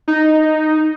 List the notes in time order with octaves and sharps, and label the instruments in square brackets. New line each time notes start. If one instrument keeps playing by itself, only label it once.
[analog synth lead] D#4